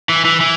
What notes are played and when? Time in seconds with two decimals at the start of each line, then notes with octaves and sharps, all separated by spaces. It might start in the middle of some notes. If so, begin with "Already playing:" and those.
0.09 E3
0.25 E3
0.41 E3